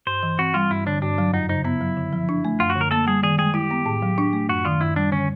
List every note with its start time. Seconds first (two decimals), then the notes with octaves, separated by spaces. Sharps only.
0.07 G2 C5
0.23 E3
0.39 C4 F#4
0.54 G3 F4
0.71 G2 E4
0.86 D3 D4
1.02 G2 D4
1.18 F#3
1.34 F#2 D#4
1.49 C#3 D#4
1.64 B3 E4
1.81 F#3
1.97 D3
2.13 F3
2.29 D4
2.45 A3
2.60 F#2 F4
2.70 F#4
2.75 D3
2.81 A#4
2.91 A#3 A4
3.07 G3 G#4
3.23 D#3 G#4
3.38 G#3 G#4
3.54 E4 G4
3.71 B3
3.86 A2
4.02 F#3
4.18 D4
4.33 A3
4.49 F#2 F#4
4.65 D#3 F4
4.81 F#2 E4
4.96 G3 D4
5.12 D3 C#4